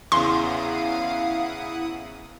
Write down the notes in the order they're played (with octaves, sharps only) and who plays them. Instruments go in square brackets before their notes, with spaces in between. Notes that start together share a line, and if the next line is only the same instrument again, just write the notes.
[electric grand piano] E2 C#3 [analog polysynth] E4 F#5 D#6 [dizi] F5 [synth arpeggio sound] C6